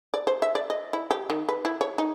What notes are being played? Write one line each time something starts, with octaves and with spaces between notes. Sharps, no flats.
D5
C5
E5
D5
D#5
E4
G4
D#3
B4
E4
C#5
D#4